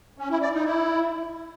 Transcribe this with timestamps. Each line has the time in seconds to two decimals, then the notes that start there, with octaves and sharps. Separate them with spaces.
0.18 C#4
0.30 E4
0.42 D5
0.53 D#4
0.65 E4